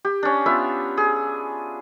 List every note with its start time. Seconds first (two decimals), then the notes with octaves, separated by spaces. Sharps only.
0.05 G4
0.23 C#4 D4
0.46 B3 F4 E5
0.97 G#4